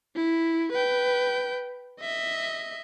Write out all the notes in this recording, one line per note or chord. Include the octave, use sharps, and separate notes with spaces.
E4
B4 G5
D#5 E5